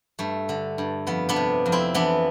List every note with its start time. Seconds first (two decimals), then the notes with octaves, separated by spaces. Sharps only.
0.19 G2 A3
0.49 D3
0.78 G2
1.07 F2 B3
1.29 B3 D4
1.36 C3
1.66 F2
1.72 C4 E4
1.94 E3 B3 D4